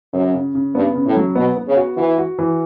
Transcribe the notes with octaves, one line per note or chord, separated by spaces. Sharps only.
F#2 C#3
C#3
C#3
G2 B3
C#3
A2
F#3
B2 B3
B3
C#3
F#4
E3 F#4
F#4
E3